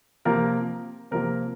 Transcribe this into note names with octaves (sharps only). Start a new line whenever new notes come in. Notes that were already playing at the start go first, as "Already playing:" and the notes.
C3 F3 A#3 A#4
C3 F3 A#3 A#4